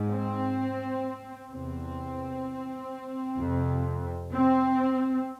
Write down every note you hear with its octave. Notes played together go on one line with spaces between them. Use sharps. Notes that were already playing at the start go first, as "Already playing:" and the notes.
Already playing: G#2
C4
E2 C3 C4
F2 C3
C4